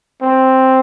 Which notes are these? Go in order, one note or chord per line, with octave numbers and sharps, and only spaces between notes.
C4